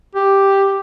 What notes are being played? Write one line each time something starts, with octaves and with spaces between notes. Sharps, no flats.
G4